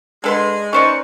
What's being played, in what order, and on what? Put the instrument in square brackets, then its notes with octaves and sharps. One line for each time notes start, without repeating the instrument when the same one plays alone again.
[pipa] D3 B4 C6 [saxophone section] G#3
[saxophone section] A#3 B4 [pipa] C#4 C5 D5 [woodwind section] D#4 C#6